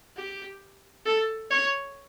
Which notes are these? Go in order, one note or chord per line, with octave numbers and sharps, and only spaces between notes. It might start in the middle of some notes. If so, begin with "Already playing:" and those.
G4
A4
C#5